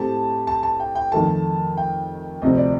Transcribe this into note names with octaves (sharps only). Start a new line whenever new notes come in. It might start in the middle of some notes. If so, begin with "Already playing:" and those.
Already playing: A2 A3 C4 G4 A5
A5
A5
G5
G5
F2 D#3 A3 A5
G5
D2 C3 F3 C4 D#5
D5